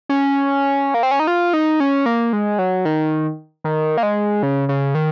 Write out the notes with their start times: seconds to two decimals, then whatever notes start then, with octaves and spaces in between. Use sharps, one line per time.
0.09 C#4
0.94 A#3
1.03 C4
1.11 C#4
1.20 D#4
1.27 F4
1.53 D#4
1.80 C#4
2.06 A#3
2.33 G#3
2.59 F#3
2.85 D#3
3.64 D#3
3.97 A#3
4.03 G#3
4.43 C#3
4.69 C#3
4.95 D#3